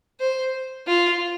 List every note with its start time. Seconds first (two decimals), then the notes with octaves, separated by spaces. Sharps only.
0.20 C5
0.88 F4